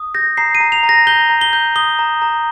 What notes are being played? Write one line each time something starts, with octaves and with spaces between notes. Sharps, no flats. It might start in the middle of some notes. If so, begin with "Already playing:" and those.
Already playing: D#6
G6 A#6
A#5 C7
D#7
A#5
F7
A#5
A#6
G6 G7
A#5
G7
G6
D#6 G7
A#5
A#5